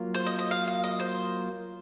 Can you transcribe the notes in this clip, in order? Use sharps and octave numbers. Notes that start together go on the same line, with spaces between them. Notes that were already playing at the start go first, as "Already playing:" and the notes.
Already playing: F#3 A#3 F4
C5
D#5
D#5
F5
F5
D#5
C5